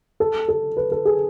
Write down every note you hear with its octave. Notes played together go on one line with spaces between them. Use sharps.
A4
A4
B4
A4
G#4